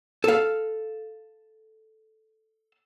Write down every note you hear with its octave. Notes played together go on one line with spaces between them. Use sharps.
A4 F5